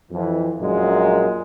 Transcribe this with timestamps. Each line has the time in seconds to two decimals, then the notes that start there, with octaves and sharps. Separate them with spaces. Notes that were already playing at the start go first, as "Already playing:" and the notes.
0.12 F2 E3
0.60 A#1 F#2 A#2 G#3